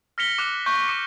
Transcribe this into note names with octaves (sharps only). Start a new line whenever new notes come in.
F6 A#6 B6 C#7 F7 G7
D6 F#6 F7
C#6 G6
D6 C#7